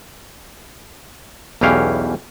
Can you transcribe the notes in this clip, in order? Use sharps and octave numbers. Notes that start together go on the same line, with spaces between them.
B1 E2 E3 C#4 G4 F5